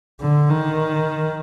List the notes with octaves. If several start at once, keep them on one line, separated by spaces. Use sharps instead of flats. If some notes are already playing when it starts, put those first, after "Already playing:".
D3
D#3